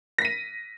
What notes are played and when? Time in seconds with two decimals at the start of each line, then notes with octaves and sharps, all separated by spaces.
0.18 A#6
0.22 B6
0.25 D#7